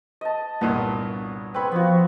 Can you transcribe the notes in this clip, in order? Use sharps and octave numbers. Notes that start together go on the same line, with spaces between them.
D#5 A5
C2 G2 A#2 B3 C#5
C4 B4 C#5 B5
F3 B3 F#4